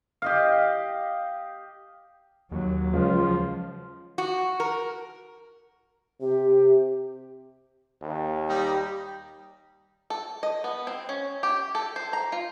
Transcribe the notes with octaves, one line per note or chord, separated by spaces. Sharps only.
G4 D#5 F5
D#2 F#3
C#2 F3 F4
F#4
A#4
C3 G4
D#2
G3 D#4 G4
A4
D#5
B3
C4
C#4
G4
A4
C5
A#5
F4